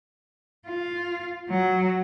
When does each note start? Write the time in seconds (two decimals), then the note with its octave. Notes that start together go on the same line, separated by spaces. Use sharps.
0.68 F4
1.49 F#3